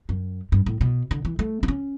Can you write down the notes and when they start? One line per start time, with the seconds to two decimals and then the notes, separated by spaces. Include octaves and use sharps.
0.09 F#2
0.52 G2
0.66 A2
0.81 B2
1.11 D3
1.25 E3
1.39 A3
1.63 D4
1.68 C#4